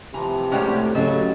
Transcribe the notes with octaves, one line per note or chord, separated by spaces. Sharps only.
C3 E3 F3 A#5
A2 G3 G#3 C#4 F#4 G4
C#3 F#3 A4 D#5 A5